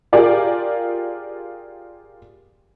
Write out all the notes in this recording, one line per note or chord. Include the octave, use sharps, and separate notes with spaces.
F4 G4 G#4 A#4 D5 F5